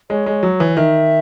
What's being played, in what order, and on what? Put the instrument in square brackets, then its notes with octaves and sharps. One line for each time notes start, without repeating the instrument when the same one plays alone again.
[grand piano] G#3 [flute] C#5
[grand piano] G#3
F#3
E3
[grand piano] D#3 [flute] E5